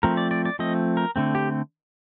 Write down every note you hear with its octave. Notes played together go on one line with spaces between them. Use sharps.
F3 A3 C4 A#4
D5
D5
D5
F3 A3 C4 D#5
A#4
D3 A3 C4
G4